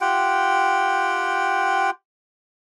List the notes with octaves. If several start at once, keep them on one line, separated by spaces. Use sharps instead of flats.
F4 G4 F#5 G5